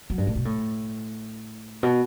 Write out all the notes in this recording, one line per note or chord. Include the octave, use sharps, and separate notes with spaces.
F#3
G2
A2
B2
A2
B2